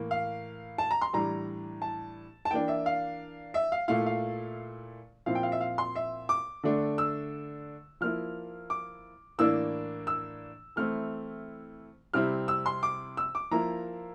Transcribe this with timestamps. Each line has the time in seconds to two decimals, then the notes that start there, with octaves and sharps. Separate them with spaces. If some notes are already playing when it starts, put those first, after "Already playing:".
Already playing: A2 E3 A#3
0.11 F5
0.78 A5
0.91 A#5
1.01 C6
1.13 A2 E3 G3 D4 A#5
1.82 A5
2.45 A5
2.51 E3 A#3 D4 G5
2.68 E5
2.86 F5
3.54 E5
3.72 F5
3.88 A#2 A3 E4 F5
4.06 F5
5.26 A#2 F3 C4 E4 F5
5.35 G5
5.43 F5
5.52 E5
5.61 F5
5.78 C6
5.96 E5
6.29 D6
6.63 D3 A3 D4
6.98 E6
8.01 F3 A#3 E4 F6
8.70 D6
9.39 A2 E3 A#3 D4 E6
10.07 E6
10.76 E3 A3 C4 E4 F6
12.14 C3 G3 C4 E4 F6
12.48 E6
12.66 C6
12.83 D6
13.17 E6
13.35 D6
13.51 F3 A#3 E4 A#5